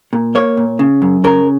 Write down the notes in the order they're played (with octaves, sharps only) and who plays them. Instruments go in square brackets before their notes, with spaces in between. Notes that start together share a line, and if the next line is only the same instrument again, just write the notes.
[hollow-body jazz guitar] A#2
A#3 C#5
A#2
C#3
F#2
C#3 A#4